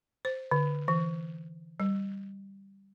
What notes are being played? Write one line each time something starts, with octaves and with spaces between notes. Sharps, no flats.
C5
D3
E3
G3